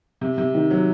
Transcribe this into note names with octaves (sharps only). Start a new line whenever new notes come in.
C3
C3
D#3
F#3